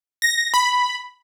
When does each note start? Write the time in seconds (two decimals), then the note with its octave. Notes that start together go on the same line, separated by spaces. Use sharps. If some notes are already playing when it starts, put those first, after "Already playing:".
0.22 A#6
0.54 B5